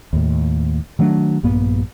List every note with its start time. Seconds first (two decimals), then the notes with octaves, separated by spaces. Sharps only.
0.13 D#2 A2
0.99 D#3 F#3 A3 D4
1.43 A#1 G2 A#3 B3